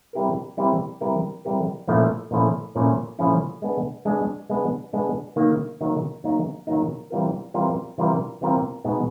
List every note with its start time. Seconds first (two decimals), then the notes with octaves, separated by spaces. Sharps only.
0.13 G3 C4 E4 G4 A#4
0.57 G3 C4 E4 G4 A#4
1.01 G3 C4 E4 G4 A#4
1.45 G3 C4 E4 G4 A#4
1.88 A#2 F3 A3 C#4 E4
2.31 A#2 F3 A3 C#4 E4
2.75 A#2 F3 A3 C#4 E4
3.19 A#2 F3 A3 C#4 E4
3.62 G#3 B3 D4
4.05 G#3 B3 D4
4.49 G#3 B3 D4
4.93 G#3 B3 D4
5.36 D#3 F#3 A#3 D#4
5.81 D#3 F#3 A#3 D#4
6.24 D#3 F#3 A#3 D#4
6.67 D#3 F#3 A#3 D#4
7.10 E3 G3 C4 F4 A#4
7.54 E3 G3 C4 F4 A#4
7.98 E3 G3 C4 F4 A#4
8.41 E3 G3 C4 F4 A#4
8.84 B2 G#3 B3 D#4 G#4